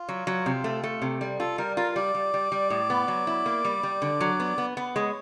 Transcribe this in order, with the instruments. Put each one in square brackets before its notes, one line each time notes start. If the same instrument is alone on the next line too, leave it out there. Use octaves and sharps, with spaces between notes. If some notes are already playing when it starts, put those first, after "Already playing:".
Already playing: [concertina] F4
[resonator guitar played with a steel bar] F#3
F#3
C3
A3
A3
C3
G3
[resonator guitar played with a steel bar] F4 [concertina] A4
[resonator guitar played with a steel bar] G3 [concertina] A#4
[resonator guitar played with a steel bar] F4 [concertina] A#4
[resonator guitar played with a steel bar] G3 [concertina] D5
[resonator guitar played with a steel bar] G3
G3
G3
A2
B3
F#3
E4
A#3
G3
G3
D3
F#3
B3
B3
B3
[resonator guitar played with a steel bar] G#3 [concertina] C#5